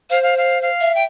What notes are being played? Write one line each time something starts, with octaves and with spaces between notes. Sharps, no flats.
C5 F5
F5
F5
F5
E5
G5